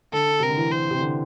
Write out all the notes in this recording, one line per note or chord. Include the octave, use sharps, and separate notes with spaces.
D3 A4
C3 A#4
D3
E3
C5
C3
D3